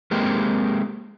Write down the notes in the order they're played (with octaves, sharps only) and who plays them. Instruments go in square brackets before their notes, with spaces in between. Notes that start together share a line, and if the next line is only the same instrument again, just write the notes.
[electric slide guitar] G#3 A#3 C4 G4